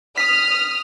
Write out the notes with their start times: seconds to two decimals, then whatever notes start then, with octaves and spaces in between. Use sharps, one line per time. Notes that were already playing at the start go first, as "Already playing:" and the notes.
0.18 D#6 F6 B6